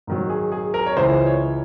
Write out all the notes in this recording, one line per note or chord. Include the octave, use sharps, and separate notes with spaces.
G#2 D#3 F#3
G#4
G#4
A#4
C#5
C#2 C#3 E3 C5
C#5